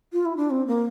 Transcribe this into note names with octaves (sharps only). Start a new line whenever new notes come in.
F4
E4
D4
C4
A#3